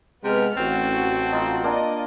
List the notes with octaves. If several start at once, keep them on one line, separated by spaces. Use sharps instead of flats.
C3 G#3 B3 B4 F6
A1 C4 F#4 A4
D#4 F4
A#3 D4 D5 D#5